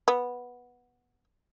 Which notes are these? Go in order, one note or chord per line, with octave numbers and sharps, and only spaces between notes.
B3